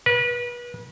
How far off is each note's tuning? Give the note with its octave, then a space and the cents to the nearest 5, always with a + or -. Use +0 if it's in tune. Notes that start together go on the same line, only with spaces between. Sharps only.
B4 -35